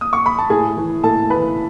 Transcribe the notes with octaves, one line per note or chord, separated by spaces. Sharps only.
D#6
C#6
B5
A5
A2 G#4 G#5
E3
A2 A4 A5
E3 B4 B5